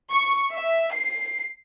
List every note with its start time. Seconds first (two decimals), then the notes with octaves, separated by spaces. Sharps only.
0.10 C#6
0.53 E5
0.92 C7